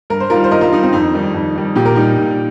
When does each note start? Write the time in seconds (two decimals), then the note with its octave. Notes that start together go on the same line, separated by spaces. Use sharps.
0.10 G2 A#4
0.20 C5
0.30 D#3 G3 F4 A#4
0.44 C5
0.51 G2 A#4 D#5
0.61 F4 A#4
0.73 D#3 G3 D#4
0.83 C4
0.93 F2 D#4
1.14 D#3 G3
1.34 F2
1.55 D#3 G3
1.76 A#2 G4
1.85 A#4
1.95 G3 D#4 G4
2.17 A#2